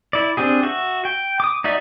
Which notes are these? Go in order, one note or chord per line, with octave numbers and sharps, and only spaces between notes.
E4 D5
C4 D4 G4 G#4
F#4 E5
G5
D6 D#6
D#4 F#4 D5 E5